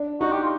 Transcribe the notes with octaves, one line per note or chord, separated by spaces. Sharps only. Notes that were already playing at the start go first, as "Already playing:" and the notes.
Already playing: D4
D#4 F#4
G4
F4